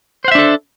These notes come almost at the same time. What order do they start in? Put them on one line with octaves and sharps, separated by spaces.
C5 F#5 E5 D4 A4